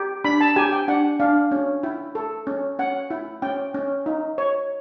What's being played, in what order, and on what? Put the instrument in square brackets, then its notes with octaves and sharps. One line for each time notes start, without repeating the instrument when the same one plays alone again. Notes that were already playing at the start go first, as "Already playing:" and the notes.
Already playing: [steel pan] G4
D4 B5
A5
G4 G#5
G5
D4 F#5
D4 F5
C#4
E4
A4
C#4
C#4 F#5
E4
C#4 G5
C#4
D#4
C#5